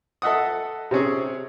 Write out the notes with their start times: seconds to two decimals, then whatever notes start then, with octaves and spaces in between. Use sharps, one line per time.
0.22 A4 D#5 E5 F#5 D#6
0.91 C3 C4 C#4 G#4